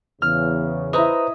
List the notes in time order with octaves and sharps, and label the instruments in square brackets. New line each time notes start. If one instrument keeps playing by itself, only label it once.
[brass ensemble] E2 C#3 [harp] F6
[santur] E4 D#5 [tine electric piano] B4 C5 A#5